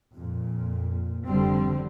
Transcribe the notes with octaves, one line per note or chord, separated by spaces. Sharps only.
F2 A#2
F1 D3 G3 C4